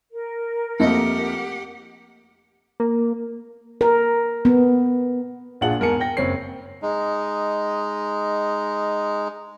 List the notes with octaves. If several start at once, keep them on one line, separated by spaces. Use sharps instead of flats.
A#4
F2 A3 A#3 C4 F4 G4 D#5 F#5
A#3
A#4
B3
A#1 D4 F4 G#4 F#5 F#7
E2 G#2 A#4 G#5 A5 C#7
G5 A#6
F#1 C4 C#5 C7
G#3 D#4